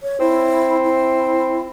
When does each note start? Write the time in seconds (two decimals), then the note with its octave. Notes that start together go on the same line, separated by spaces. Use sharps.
0.03 C#5
0.20 C4 E4
0.84 E4